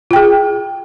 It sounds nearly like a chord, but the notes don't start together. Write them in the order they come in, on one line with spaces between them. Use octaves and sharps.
F4 G5 G#4